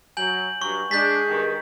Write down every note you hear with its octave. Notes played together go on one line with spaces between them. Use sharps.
F#3 G#5 G6 F#7
G2 F#3 C#6
G#3 D4 G6 A6 B6
G2 D#3